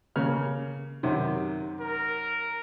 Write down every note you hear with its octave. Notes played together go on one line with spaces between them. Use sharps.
C#3 A#3 F6
F#2 C3 D#3
A#4